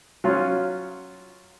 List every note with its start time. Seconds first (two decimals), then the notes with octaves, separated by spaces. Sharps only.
0.24 F#3 C#4 F4